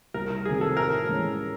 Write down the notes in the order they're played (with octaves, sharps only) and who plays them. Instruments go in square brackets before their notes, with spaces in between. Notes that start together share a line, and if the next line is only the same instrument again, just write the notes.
[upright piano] C2 [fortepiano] A#4
[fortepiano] A#4
[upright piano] C3 D#3 F#3 A3 [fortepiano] G#4
[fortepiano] A4
[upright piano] A2 [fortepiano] A#4
[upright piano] E3 G#3 C#4